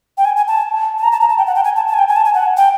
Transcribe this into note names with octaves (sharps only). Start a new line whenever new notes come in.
G5
G#5
G#5
A5
A5
A#5
A5
A#5
A5
G5
F#5
G5
G#5
A5
A5
G#5
G5
G#5
A5
G#5
F#5
G5